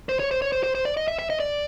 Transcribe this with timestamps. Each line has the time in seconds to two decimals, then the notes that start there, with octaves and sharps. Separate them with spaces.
0.09 C5
0.20 C#5
0.31 C5
0.42 C#5
0.53 C5
0.63 C5
0.75 C5
0.85 D5
0.97 D#5
1.08 E5
1.19 E5
1.30 D#5
1.40 D5